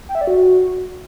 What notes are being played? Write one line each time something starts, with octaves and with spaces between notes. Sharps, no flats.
G5
E5
D5
F#4